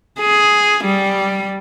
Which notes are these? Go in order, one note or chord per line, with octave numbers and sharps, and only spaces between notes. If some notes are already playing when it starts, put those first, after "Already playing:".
G#4
G3